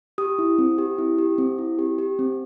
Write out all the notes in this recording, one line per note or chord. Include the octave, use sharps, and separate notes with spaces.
G4 D#6
E4
C4
G4
E4
G4
C4
E4
G4
G4
C4